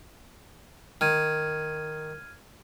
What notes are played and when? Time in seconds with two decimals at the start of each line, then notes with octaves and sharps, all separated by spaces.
1.01 D#3 F6 G#6 D#7